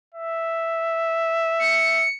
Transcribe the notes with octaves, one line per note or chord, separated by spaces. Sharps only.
E5
C#7